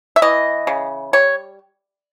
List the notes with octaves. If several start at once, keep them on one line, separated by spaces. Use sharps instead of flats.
E5
E3 D#5
C#3
G3 C#5